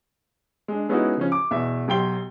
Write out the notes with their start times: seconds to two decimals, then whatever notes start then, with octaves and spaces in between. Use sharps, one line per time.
0.68 G#3 D4
0.89 G#3 B3 C#4 D#4 E4 F#4
1.17 C#3 F3 C#4
1.32 D6
1.51 E2 B2 E5
1.88 B1 F#3 G4 G5 C6 G7